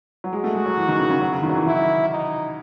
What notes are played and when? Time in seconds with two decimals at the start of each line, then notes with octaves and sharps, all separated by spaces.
0.24 F#3
0.33 G#3 F#4
0.44 A3
0.55 G#3
0.66 F#3
0.77 E3
0.88 D#3
1.00 C#3
1.10 C#3
1.21 F#3
1.32 C#3
1.43 D#3
1.49 F#3
1.55 E3
1.66 D#3 E4
2.10 D#4